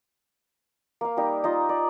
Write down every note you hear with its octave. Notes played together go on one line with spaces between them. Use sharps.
A#3 F5
G3 A#3 D#4 G4
D#4 F4 D#5
D5